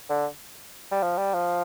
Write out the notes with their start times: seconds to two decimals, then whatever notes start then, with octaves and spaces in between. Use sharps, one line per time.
0.10 D3
0.91 G3
1.02 F3
1.18 G3
1.34 F3